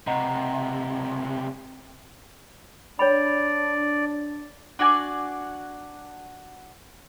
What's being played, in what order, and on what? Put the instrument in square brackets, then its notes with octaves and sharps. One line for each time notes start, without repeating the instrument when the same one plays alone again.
[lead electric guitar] C#2 C3 [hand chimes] D#5 F#5 A#5
[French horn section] D4 [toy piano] C#5 B5 [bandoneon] D5
[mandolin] D4 F#4 D5 G#5